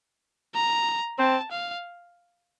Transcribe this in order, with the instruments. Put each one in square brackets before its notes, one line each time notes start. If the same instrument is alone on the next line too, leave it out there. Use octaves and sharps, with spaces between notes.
[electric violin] A#5
[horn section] C4 [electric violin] A5
[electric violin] F5